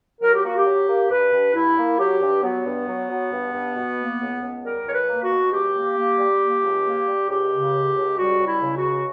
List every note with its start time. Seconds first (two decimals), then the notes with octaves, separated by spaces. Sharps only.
0.22 F#3 A#4
0.34 G4
0.44 A#3 F#4
0.56 G4
0.66 F#3
0.88 A#3
1.10 G2 B4
1.33 G2
1.54 G2 E4
1.77 A#3
1.98 F#3 G4
2.21 G2
2.43 F#3 B3
2.65 G2
2.87 F#3
3.09 F#3
3.31 G2
3.53 G2
3.75 B2
3.98 A#3
4.20 C#2
4.41 C#2
4.64 G3 A#4
4.85 C#2 C#5
4.93 B4
5.08 A#3
5.23 F#4
5.31 B2
5.52 C#2 G4
5.74 A#3
5.96 A#3
6.18 G3
6.41 A#3
6.63 C#2
6.85 A#3
7.07 G3
7.29 C#2 G4
7.51 C#3
7.73 C#2
7.96 C#2
8.17 G3 F#4
8.39 C#2
8.47 E4
8.62 C#3
8.76 F#4
8.84 C#2